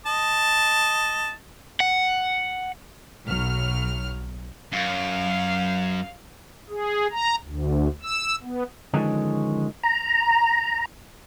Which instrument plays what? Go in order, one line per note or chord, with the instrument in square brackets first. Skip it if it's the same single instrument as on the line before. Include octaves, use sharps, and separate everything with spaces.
[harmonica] D#5 A5
[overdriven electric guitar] F#5
[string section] B1 F#3 F6
[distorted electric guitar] F#2 [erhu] F5
[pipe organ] G#4
A#5
D2
E6
B3
[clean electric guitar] D3 D#3 F3 G#3 C#4
[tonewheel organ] A#5